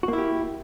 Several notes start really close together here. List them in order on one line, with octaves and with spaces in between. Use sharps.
F#4 A#3 E4 G4